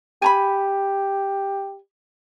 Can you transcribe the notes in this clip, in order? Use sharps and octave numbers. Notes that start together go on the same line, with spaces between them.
G4 G#5 A#5 B5